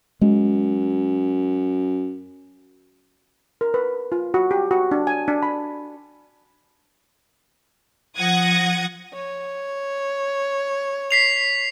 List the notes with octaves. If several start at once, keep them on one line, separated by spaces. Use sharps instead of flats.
F#2 G#3
A#4
B4
F4
F#4
G4
F#4
D4
G#5
D4
B5
F3 F#5 D#6 G#6 A#6
C#5
B6 C7 F7